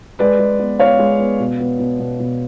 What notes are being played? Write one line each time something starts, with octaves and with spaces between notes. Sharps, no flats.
G#3 B4 D5
G#3
B3
B3 C#5 F5
G#3
B3
B2
B3
B2
B2
B2